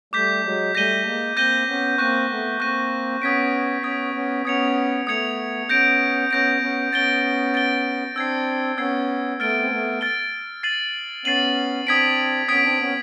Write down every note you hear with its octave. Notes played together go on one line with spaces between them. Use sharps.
G3 A3 D6 G6 B6
F#3 G#3
G3 A3 G6 A#6 D#7 G7
G#3 A#3
A#3 C4 G6 A#6 D#7 G7
B3 C#4
A#3 C4 C#6 F#6 A#6 D#7
A3 B3
A#3 C4 C#6 F#6 A#6 D#7
B3 C#4 D#6 G#6 B6 D7
B3 C#4 D#6 G#6 B6 D7
B3 C#4
B3 C#4 D#6 G#6 C#7 F7
A3 B3 D#6 G#6 C#7 F7
B3 C#4 G6 A#6 D7
B3 C#4 G6 A#6 D7
B3 C#4
B3 C#4 A6 D7 G7
A6 D7 G7
C4 D4 E6 G#6 C7
B3 C#4 E6 G#6 C7
A3 B3 F6 A6 D7 G7
C4
A3 B3
F6 A6 D7 G7
A6 C7 D#7 F#7
B3 C#4 A6 C7 D#7 F#7
C4 D4 D#6 G#6 B6 D7
B3 C#4 D#6 G#6 B6 D7
C4 D4
B3 C#4